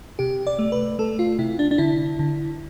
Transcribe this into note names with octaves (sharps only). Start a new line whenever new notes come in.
C3 G4
D5
A3
B4
A3 A4
F4
C3 E4
D4
D4
D3 E4
D3